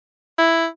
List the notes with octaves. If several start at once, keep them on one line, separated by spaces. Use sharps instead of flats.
E4